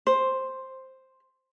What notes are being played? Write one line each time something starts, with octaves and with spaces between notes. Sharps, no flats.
C5